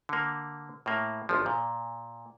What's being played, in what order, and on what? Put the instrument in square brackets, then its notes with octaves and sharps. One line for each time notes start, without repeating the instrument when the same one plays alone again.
[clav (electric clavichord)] D3 A#3
A2 A#3
G#1 F3
A#2